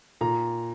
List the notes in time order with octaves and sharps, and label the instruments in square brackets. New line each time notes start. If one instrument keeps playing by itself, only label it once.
[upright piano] A#2 A#5